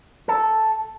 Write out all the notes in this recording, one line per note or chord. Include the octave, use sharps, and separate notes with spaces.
A4